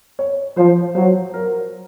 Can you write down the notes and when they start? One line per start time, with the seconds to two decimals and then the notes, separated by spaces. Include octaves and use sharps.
0.19 C#5
0.57 F3 C5
0.95 F#3 C5
1.34 A#4